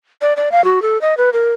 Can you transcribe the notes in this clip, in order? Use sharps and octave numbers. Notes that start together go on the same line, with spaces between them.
D5
D5
F5
F#4
A4
D#5
B4
A#4